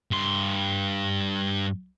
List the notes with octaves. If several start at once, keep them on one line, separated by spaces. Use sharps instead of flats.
G2 C6